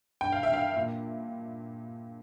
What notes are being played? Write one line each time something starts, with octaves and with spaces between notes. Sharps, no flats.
G2 G5
F5
E5
G2 F5
A#2